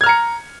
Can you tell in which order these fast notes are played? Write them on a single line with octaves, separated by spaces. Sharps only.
G#6 F6 A#5 C#7